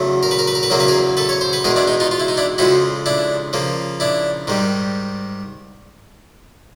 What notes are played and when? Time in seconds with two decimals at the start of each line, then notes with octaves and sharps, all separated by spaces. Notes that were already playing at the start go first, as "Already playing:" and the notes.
Already playing: E2 C#3 F#3 A3
0.23 A#4
0.31 B4
0.39 A#4
0.48 B4
0.55 A#4
0.63 B4
0.70 E2 C#3 F#3 A#3 A#4
0.80 B4
0.88 G#4 A#4
1.17 A4 B4
1.29 C#5
1.41 C5
1.53 B4
1.64 E2 B2 G#3 G#4 A#4
1.76 D4 E4
1.87 D#4
2.00 D#4 F4
2.11 F4
2.20 E4
2.28 D#4
2.37 D4 E4
2.58 F2 C#3 F3 G#3 E4 F#4
3.06 D4 E4
3.53 C#3 F3 A#3
4.00 D4 E4
4.47 G#2 D#3 G3